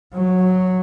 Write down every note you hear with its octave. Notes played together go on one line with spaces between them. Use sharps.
F#3